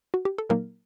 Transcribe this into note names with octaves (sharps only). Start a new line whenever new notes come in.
F#4
G4
A4
A#2 F#3 A#3 D#4 A#4